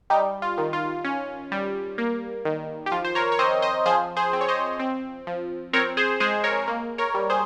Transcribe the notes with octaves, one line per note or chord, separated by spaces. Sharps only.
G3 D#4 G4
F4
D#3
F4
C#4
G3
A#3
D#3
G4
F3 F4
C5
A#4 C#5
C#5
C4 C5 D#5
C5 D#5
F3 G#4 C5
G#4 C5
C4
C#5
C5 D#5
C4
F3
C4 A#4 C#5
G#4 C5
G#3 G#4 C5
A#4 C#5
A#3
A#4 C#5
G3
G#4 C5